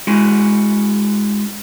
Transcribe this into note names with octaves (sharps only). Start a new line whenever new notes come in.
G#3 C#4 E4 F#4